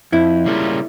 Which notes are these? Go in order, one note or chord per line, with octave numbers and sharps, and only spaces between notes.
F2 E4
C#3 G3 A#3 F4